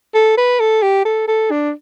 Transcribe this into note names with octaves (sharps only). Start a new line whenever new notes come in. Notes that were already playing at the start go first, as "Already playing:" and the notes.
A4
B4
A4
G4
A4
A4
D4